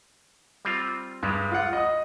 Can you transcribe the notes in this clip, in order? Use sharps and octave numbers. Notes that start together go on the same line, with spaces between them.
G3 C4 F4
G2 G3 G#3
F4 F#5
D#5 D#6